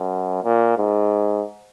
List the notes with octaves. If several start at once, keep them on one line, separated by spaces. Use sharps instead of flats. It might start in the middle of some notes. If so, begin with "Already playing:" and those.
Already playing: F#2
A#2
G#2